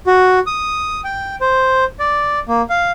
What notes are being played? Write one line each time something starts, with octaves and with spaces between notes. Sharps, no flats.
F#4
D#6
G5
C5
D5
A#3
F5